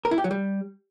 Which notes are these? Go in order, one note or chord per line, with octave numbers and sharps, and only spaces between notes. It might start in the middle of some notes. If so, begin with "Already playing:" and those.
A#4
E4
G4
F#3
G3